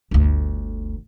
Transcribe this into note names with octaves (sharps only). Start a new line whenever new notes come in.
G1 D2